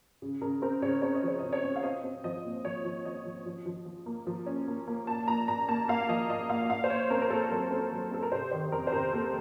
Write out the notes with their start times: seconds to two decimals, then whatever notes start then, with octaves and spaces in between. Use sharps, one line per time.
0.22 C#3
0.41 C#3 A#4
0.62 C4 A#4
0.82 C#3 C#5
1.02 C4 C#5
1.15 D#5
1.23 F3 C#5
1.39 C#3 D#5
1.53 C#5
1.64 C4
1.76 F5
1.83 C4 D#5
2.04 C4
2.24 F3 D#5
2.44 A#2
2.65 F3 C#5
2.85 F3
3.05 F3 D#5
3.25 F3
3.46 F3
3.66 F3
3.85 F3
4.06 A#3
4.27 F3
4.46 C#4
4.68 A#3
4.87 A#3
5.07 A#2 A5
5.28 A#2 A#5
5.48 A#2 A#5
5.68 A#3 A5
5.88 A#3 F5
6.09 F3 D#5
6.29 A#2 D#5
6.49 A#2 F5
6.70 A#2 F5
6.84 C5
6.90 A#2 C#5
7.10 C4 A#4
7.22 A#4
7.30 A#2 A4
7.51 F#3 A#4
7.71 C4
7.91 F#3
8.11 C4 A4
8.23 A#4
8.32 C3 C5
8.51 D#3 C5
8.72 F2 A#4
8.87 C5
8.92 C3 A#4
9.13 A#3 A4